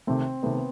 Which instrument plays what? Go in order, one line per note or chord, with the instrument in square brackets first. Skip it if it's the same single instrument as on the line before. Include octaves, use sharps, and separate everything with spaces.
[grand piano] C3 D#3 A3 [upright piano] C4
[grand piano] C3 D#3 A3 [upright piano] B3